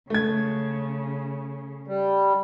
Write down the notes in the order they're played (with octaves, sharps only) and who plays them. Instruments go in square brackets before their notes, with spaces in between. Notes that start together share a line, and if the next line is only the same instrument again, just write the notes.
[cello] C#3 [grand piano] A3 G#6
[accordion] G3